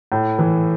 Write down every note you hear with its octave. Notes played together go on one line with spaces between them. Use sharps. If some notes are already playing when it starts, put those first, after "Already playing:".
A2
E3